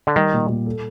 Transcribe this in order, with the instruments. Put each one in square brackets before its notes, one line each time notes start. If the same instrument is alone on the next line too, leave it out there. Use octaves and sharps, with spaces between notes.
[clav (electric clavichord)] D3
[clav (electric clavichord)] D#3 [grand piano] G3
[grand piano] A#2
A#2
A4